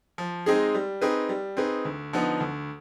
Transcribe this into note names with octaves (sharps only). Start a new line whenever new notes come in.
F3
G#3 C4 D#4 G#4
G3
C4 D#4 G#4 B4
G3
C4 D#4 G#4 B4
D2
D3 F3 B3 D#4
D2